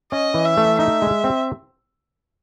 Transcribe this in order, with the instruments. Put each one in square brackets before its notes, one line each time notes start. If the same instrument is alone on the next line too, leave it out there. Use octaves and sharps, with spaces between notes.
[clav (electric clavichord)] C#4 [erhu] D#5
[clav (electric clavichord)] E3
[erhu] E5
[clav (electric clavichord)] A3
[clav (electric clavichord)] D#4 [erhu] E5
[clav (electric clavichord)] G#3
C4